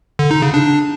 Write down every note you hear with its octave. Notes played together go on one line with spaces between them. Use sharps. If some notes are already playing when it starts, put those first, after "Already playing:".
D3
D#4
C#3
D4